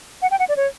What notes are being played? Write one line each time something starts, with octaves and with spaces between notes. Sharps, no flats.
F#5
G5
F#5
D5
C#5